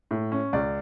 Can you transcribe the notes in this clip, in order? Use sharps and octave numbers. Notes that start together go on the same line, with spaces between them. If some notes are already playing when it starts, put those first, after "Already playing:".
A2
C#4
C#2 D5